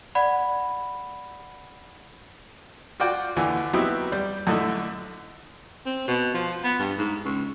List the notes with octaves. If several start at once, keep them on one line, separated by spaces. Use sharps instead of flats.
D5 F#5 B5
F4 F#4 D5 G5
D#2 D3 E3
F#3 B3 C4 D#4 E4 G4
G3
F#2 D3 A3 D#4 E4
C4
B2
F3
B3
G2
G#2
C#2